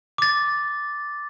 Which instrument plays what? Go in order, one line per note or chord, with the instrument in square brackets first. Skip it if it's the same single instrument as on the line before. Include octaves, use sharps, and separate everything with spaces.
[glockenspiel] D6 A6